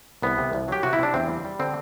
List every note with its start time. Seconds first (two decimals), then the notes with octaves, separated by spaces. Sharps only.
0.22 C2 B3
0.38 C3
0.53 C2
0.68 F#3 G4
0.83 C3 F#4
0.93 E4
0.99 C3 D4
1.14 E2 C4
1.29 G3
1.45 G3
1.59 D3 C4